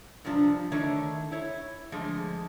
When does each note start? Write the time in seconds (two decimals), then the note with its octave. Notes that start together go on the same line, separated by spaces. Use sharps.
0.25 G2 C3 F3 D4
0.72 D3 D#3 A3 D4 C#5
1.31 E4 C#5
1.92 D3 F3 G#3 A3